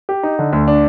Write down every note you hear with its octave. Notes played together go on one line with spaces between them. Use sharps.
G4
D#4
D3
D2
D4